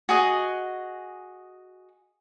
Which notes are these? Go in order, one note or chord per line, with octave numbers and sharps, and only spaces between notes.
F#4 G#4 D#5